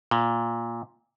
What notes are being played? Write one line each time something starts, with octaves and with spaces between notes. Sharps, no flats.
A#2